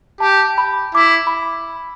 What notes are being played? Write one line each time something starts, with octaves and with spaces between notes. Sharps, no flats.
G4 A5
B5
E4 D6
B5